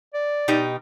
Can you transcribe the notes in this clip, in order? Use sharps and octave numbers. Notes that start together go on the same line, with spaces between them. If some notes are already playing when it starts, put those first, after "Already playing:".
D5
B2 D#4 G4